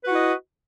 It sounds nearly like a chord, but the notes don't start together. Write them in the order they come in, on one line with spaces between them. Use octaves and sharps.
B4 F#4 E4 D#5